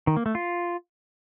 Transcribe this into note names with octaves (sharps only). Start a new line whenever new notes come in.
D#3
A#3
A3
F4